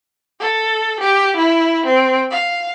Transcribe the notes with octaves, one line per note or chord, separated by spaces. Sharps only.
A4
G4
E4
C4
F5